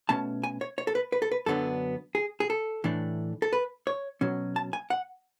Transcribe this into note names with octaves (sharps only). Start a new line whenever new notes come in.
B2 A3 C#4 A5
G#5
C#5
C#5
A4
B4
B4
A4
B4
F#2 D3 F#3 B3 D4 A4
G#4
G#4
A4
A2 E3 A3 D4
A4
B4
C#5
B2 F#3 C#4
A5
G#5
F#5